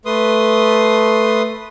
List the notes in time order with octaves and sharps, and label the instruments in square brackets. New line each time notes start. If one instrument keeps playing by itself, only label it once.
[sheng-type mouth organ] A3 B4 C6 D#6